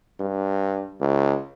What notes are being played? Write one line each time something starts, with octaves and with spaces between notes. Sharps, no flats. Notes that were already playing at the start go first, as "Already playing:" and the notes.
G2
C#2